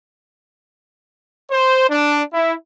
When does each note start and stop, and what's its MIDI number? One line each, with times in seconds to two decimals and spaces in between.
1.50 1.87 72
1.89 2.22 62
2.33 2.54 64